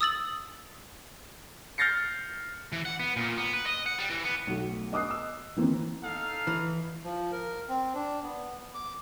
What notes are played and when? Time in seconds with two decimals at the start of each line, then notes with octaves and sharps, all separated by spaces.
0.01 D#6 E6 A6 F#7
1.78 F6 G6 A6 A#6 C7 C#7
2.72 E3
2.85 F#5
3.00 B3
3.16 A#2
3.38 B3
3.53 B4
3.67 D#5
3.86 F#5
3.99 G3
4.10 E3
4.25 B3
4.47 B1 B2 A3
4.93 D#5 D6 D#6 F#6 C7
5.11 E6
5.56 D#3 E3 A#3 C4
6.02 D#4 A4 F5
6.47 E3
7.04 F3
7.32 A#4
7.69 C4
7.94 D4
8.23 B3
8.74 D6